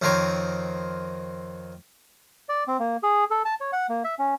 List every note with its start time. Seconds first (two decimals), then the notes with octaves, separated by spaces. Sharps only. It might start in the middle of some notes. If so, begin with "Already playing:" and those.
0.02 F2 D#3 C4 A#4 C#5
2.49 D5
2.68 C4
2.79 A#3
3.03 G#4
3.30 A4
3.45 A5
3.61 C#5
3.73 F#5
3.89 A#3
4.04 E5
4.19 C#4